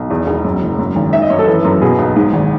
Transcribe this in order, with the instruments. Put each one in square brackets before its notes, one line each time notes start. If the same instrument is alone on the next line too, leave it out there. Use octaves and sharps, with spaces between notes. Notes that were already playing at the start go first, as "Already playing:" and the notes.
Already playing: [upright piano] B1
E2
E1
F#2
F#1
F#2
G#1
D#3 E5
D#5
F#2 C#5
A4
E3
F#2
B2 G#4
B1
G#2
G#1